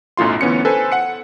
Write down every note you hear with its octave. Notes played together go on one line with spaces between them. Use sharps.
B1 F#2 A2 F4 C6
D2 E3 B3 C#4 C#7
A4 B4 C5 G#5
F#5 C#7